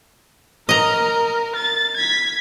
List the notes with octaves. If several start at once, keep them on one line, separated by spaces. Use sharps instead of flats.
A#4 D#5 A#5
A6
G#6 B6